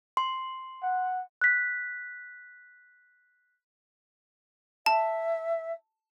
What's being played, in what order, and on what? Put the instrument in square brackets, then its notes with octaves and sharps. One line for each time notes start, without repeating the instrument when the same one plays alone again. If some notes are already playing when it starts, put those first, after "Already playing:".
[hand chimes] C6
[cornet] F#5
[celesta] F#6 B6
[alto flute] E5 [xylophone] A5